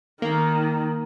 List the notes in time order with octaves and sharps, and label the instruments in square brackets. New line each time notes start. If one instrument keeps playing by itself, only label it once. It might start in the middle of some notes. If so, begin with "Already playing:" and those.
[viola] D#3 [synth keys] A#3